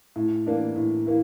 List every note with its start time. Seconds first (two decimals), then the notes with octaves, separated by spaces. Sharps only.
0.16 A2
0.47 E3 A#3 D4
0.76 A2
1.07 E3 A#3